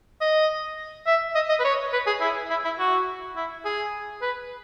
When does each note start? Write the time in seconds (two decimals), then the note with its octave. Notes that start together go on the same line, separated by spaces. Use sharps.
0.21 D#5
1.06 E5
1.35 D#5
1.49 D#5
1.59 B4
1.64 C#5
1.93 B4
2.07 G#4
2.21 E4
2.50 E4
2.64 E4
2.79 F#4
3.36 E4
3.65 G#4
4.22 B4